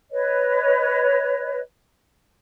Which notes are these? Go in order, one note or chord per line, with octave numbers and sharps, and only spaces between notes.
B4 C#5 D#5